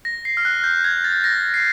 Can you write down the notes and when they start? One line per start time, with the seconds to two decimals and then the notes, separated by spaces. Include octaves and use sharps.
0.05 A#6
0.25 C7
0.37 F6
0.45 F#6
0.64 G6
0.84 G#6
1.04 A6
1.24 A#6
1.54 C7